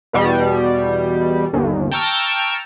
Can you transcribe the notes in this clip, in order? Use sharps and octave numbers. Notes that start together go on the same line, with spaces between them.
E2 B2 G3
G1 D#2
G5 A5 A#5 C#6 E6 F6